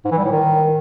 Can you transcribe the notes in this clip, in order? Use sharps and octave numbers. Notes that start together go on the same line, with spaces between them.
G#2
E3
G3
A2
D#3